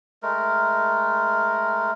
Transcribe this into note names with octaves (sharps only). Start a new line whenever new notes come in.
G#3 A3 A#4